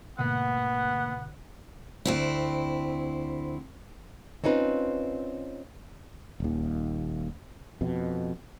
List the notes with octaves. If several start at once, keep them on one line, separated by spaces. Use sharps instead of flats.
D2 G#2 B2 D3 A#3 B3 F#5
D2 C4 E4
C4 C#4 D#4 F4 B4
D#1 D#2
F2 B2